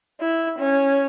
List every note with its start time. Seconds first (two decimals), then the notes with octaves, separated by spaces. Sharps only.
0.20 E4
0.59 C#4